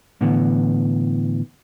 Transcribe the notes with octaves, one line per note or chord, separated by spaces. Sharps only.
A2 D3 E3 B3